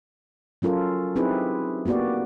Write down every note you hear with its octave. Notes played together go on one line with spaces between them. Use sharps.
F#3 C#4 F4 A4 A#4
C4 D#4 E4 G4 G#4 B4
A#3 B3 F#4 G4 D5